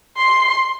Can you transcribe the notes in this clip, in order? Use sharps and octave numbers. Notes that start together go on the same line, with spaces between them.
C6